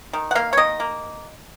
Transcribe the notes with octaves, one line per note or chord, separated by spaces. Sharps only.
D#3
F#5
A#3 F5
C#5
D#3 D#5
A#3